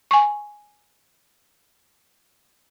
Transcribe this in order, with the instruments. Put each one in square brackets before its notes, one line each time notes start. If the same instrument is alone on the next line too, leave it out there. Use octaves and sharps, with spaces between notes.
[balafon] G#5 C#6